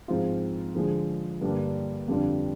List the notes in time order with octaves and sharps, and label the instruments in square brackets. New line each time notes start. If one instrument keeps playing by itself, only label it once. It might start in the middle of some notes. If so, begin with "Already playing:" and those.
[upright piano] G#2 F3 C4 F4
D3 F3 G#3
G2 D3 G3 A#3 D4
F2 D3 G3 D4 F4